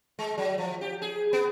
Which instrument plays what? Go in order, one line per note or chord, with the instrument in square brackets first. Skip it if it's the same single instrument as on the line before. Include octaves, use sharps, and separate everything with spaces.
[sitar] G#3
F#3
F3
G4
G#4
B3